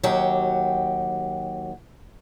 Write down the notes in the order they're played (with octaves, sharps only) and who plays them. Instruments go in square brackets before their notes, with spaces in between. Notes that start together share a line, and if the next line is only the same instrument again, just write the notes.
[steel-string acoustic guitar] D#2 F#3 F#4 G4